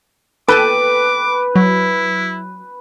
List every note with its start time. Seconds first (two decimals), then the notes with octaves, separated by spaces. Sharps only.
0.48 A4 B4 G5 A5 D6
1.55 F#3 E4